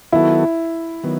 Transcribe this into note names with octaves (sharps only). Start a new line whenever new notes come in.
D#3 F#3 B3 E4 F#4 A4
D#3 F#3 B3